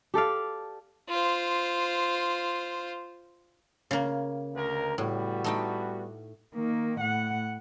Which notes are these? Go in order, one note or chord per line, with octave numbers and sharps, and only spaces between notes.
G4 A4 D5 F5
F4 C5
C#3 A#3
D2 A#4
A2 G3 B3 F#4
A3 D#4 G5
D#3 A#3
A2 F#5